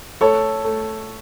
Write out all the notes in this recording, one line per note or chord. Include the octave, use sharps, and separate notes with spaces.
A3 A4 C#5
A3